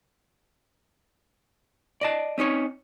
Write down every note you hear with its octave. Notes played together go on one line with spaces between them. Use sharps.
D5 D#5 A5
C4 C#4 D#4 C#5